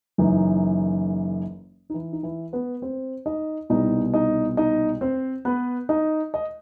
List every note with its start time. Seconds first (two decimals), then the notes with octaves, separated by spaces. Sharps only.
0.18 F#1 F#2 E3 D#4
1.90 D#4
1.94 E3 E4
2.13 D#4
2.23 E3 E4
2.53 B3 B4
2.82 C4 C5
3.26 D#4 D#5
3.70 C2 B2 D#4 D#5
4.14 D#4 D#5
4.57 D#4 D#5
5.01 C4 C5
5.45 B3 B4
5.89 D#4 D#5
6.34 D#5